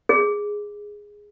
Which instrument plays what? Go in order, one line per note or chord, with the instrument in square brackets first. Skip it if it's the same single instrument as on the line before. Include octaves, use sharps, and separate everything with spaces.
[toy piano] G#4